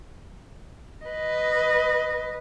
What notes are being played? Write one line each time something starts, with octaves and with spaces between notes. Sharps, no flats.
B4 D#5